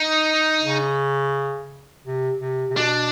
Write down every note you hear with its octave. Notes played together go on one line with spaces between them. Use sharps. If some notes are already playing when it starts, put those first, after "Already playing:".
Already playing: D#4
C#3
C3
C3
C3
B2 D4